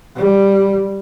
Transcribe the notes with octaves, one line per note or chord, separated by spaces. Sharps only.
G3